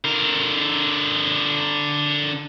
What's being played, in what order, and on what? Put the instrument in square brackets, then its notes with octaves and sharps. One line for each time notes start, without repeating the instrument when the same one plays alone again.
[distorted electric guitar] D3 A#4